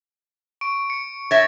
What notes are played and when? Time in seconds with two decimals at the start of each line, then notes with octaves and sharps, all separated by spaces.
0.61 C#6 D7
0.90 C#7
1.31 C#5 E5 A6 A#6